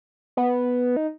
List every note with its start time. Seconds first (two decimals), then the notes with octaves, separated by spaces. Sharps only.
0.37 B3
0.97 D#4